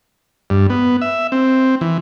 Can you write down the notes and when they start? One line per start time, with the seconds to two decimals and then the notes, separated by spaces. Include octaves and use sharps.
0.50 G2
0.70 B3
1.01 E5
1.32 C4
1.81 E3